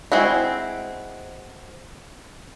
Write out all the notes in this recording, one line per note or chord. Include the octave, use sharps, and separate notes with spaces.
G#3 C4 E4 F#4